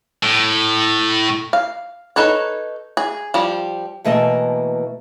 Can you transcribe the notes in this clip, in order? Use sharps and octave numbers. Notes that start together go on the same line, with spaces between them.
A2
F5
D#4 A4 B4 C#5
G#4
F3 G3
B2 E3 A3 A#3 D#5 A5